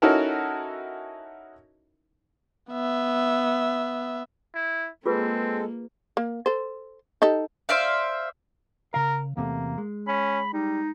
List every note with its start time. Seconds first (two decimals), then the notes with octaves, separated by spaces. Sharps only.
0.02 C#4 D#4 E4 F#4 A4 A#4
2.71 B3 E5
4.54 E4
5.06 G#3 A#3 C4 F4 G#4 A4 B4
6.17 A#3
6.46 A4 C5
7.22 D#4 G4 A4
7.69 C5 D5 E5 F5
8.94 C#3 A#4 F5
9.37 E2 C3 A3 A#3
9.78 G#3
10.07 C#4 B5
10.53 G3 D#4